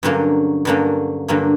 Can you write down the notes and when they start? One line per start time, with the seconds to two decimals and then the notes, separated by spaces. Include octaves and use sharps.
0.03 G2 D3 F#3 A#3 C#4
0.65 G2 D3 F#3 A#3 C#4
1.28 G2 D3 F#3 A#3 C#4